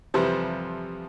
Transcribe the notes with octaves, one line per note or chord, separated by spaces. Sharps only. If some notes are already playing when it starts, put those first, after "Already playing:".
F2 C3 E3 F3 G3